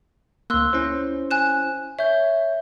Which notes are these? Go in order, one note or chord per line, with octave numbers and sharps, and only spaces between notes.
D2 A#3 C6 E6 F#6
C#4 E4 C5
G#5 F#6 E7
C#5 E5 G6